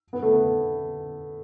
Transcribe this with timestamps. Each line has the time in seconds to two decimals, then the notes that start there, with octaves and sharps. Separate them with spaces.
0.13 B3
0.22 A3
0.33 B3